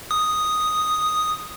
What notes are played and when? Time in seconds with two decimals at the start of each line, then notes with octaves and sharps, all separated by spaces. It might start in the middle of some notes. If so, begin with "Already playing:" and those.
0.11 D#6